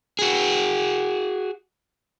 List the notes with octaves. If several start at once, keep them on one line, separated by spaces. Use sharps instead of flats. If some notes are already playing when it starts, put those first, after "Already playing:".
F#4 G#4